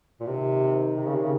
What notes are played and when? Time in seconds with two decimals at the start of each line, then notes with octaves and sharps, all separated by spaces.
0.20 A#2
0.27 C3 D#3
0.97 C3
1.06 C#3
1.15 C3
1.23 C#3